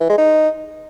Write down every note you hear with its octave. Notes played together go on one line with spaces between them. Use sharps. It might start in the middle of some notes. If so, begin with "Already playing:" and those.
E3
G#3
D#4